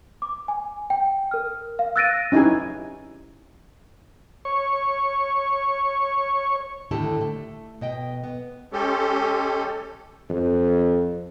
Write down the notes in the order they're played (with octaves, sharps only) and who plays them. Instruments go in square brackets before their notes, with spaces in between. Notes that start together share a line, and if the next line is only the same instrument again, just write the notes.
[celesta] D6
G#5
G5
A#4 F6
F5
E6 F#6 A6 A#6 D7 D#7
[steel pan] C#4 D#4 E4 G4 G#5
[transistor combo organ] C#5 C#6
[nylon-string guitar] D#2 A2 D3 E4 G4 A5
A3
B2 D#5 G5
B3
[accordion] G#3 C#4 G4 A4
[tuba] F2